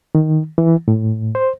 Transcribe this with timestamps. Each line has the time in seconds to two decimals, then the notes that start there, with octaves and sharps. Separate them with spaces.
0.15 D#3
0.58 E3
0.88 A2
1.35 C5